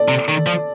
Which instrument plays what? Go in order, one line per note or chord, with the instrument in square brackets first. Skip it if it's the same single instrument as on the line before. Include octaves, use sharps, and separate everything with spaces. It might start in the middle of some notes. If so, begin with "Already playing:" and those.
Already playing: [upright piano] A4 D5
[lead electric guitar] C3
D#3
F3